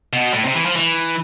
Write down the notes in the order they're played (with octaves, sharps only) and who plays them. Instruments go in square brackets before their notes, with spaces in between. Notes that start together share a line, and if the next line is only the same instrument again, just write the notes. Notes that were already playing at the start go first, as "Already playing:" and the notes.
[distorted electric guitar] B2
A2
C3
E3
F3
E3